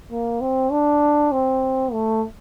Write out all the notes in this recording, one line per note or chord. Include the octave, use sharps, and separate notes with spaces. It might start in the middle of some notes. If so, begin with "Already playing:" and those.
A#3
C4
D4
C4
A3